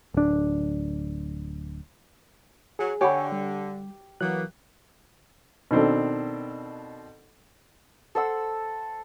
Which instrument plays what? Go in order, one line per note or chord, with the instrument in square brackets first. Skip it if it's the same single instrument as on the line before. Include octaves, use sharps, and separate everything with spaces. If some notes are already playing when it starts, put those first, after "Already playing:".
[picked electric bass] D1 D4
[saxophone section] F#3 [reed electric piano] G#4
[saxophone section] D3 [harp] G4 [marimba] C#5 F#5 B5 [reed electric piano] G#5 C#6
[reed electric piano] G3
[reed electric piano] E3 F#3 F#6 [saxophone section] A#3 B3
[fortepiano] B2 D#3 C4 D4 A4
[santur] A4 C5 F#5 E6